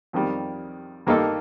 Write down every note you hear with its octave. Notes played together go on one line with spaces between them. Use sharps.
F2 D#3 G3
G2 D#3 A#3 D#4 A4